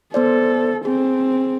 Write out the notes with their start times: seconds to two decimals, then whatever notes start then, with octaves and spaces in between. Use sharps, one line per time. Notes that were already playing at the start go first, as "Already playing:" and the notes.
0.14 B3 A4 C5 D5
0.85 C4 G#4